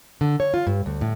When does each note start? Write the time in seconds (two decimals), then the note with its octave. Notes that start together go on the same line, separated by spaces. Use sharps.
0.21 D3
0.40 C#5
0.54 F4
0.67 G2
0.86 D2
1.01 A2